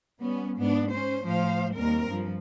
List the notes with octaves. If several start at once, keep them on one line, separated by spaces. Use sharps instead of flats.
G3 B3 C#4
G#2 B3 D4
C#4 C5
A2 F3 C5 F5
D#2 G3 C4 A#4
G2 F3